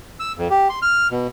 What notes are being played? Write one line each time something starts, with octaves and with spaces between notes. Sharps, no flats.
E6
F2
G4
C6
F6
B2